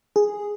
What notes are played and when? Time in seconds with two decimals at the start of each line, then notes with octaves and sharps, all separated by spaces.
0.16 G#4